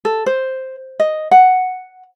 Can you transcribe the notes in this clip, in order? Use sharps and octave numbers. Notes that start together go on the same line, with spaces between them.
A4
C5
D#5
F#5